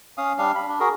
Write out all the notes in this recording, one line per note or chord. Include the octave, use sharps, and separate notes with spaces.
C#4 F5 D#6
G3 D4 F5
B5
D4
F#4 G#4 A#4